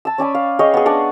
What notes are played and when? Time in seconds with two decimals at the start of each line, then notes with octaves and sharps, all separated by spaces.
0.05 A5 E6
0.18 C#4 D5 G#5 B5
0.35 F5
0.59 G#4 C#5 D#5 G5
0.74 B3 G#4
0.86 D4 D5 F#5 G#5